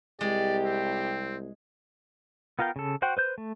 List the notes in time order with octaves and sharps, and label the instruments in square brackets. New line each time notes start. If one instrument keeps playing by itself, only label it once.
[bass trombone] C2 [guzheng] G#3 [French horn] G4 [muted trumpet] D5
[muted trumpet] C4
[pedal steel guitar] B3 F4 A#4 F5 G5
C#3 A4
F#4 C5 F#5 G5
B4 C5 G6
A3